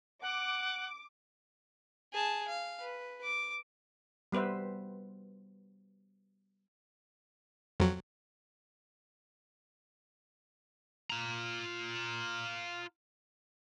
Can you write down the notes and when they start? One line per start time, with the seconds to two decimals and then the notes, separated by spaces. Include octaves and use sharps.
0.22 F#5 D6
2.13 G#4 A5
2.48 F5
2.81 B4
3.23 D6
4.32 G3 B3 B4 C5 E5
7.80 F2 F#3
11.10 F4 A#5